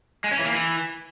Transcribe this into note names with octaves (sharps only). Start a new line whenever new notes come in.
G#3
C#4
E3
A#3
E3